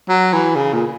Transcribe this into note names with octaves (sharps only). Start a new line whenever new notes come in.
F#3
E3
C#3
A#2